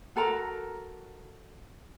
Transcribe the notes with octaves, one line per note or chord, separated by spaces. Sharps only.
F#4 A4 A#4 A#5